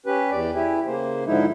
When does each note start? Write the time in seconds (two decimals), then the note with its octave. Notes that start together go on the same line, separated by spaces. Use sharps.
0.06 C#4 G4 B4
0.31 E2 D5
0.54 E4 G4 G#4
0.86 C#3 A#3 C5
1.26 G#2 D3 F3 G#3 D#4 E4